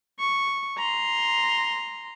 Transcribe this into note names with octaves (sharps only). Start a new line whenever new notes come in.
C#6
A#5 C6